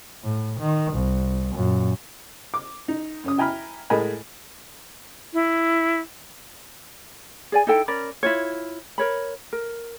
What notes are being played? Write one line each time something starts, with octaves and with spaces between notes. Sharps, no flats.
A2
D#3
C2
F#2 A#2
D6
D#4
F#2 C#4 D#6
E4 G5 G#5 A#5 B5 F6
A2 G#3 A#4 D#5 G#5 B5
E4
G#4 D5 G#5
D#4 E4 A4 G5
C#4 A#4 D5 B5
E4 F4 C#5
A#4 C#5 B5
A#4